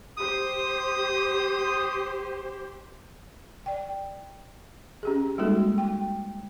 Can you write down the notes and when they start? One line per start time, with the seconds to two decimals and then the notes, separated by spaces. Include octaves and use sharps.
0.17 G4 C5 D#6
3.66 D5 G5
5.03 C#4 G4 G#4
5.38 G3 G#3 A#3 D#4 F#4 A4
5.78 G5